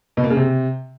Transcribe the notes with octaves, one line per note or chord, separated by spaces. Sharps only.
B2
A#3
C#3
C3